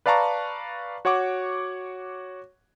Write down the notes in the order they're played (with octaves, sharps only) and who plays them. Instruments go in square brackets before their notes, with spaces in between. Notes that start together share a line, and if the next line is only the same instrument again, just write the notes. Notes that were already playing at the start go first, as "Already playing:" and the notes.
[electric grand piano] B4 D5 F5 A5 A#5 C#6
F#4 C#5 F#5 C#6 D6